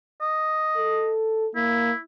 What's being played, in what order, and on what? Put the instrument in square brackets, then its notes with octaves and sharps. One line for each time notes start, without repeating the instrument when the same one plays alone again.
[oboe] D#5
[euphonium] A4
[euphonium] A#3 [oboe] E4